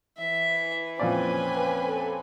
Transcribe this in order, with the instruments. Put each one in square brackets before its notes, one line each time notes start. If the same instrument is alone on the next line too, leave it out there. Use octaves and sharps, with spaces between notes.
[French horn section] E3 [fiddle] E5
[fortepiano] F2 A#2 D5 [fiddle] C4 C#4 [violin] B4 G#5
[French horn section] A4